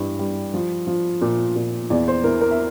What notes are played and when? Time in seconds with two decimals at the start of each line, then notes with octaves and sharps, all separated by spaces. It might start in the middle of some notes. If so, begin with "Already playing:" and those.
Already playing: G2 E3
0.19 G3
0.54 F3
0.87 F3
1.21 A#2
1.56 A#2
1.90 E2 D5
2.08 C5
2.24 E3 A#4
2.41 A#4
2.51 E5